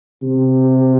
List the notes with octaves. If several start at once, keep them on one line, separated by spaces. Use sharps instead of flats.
C3